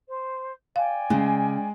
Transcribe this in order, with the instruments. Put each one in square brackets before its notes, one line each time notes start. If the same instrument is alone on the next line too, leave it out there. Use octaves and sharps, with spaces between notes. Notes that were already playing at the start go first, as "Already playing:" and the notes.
[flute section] C5
[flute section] D5 G5 G#5 [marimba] F5
[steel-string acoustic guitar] C#3 [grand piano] G#3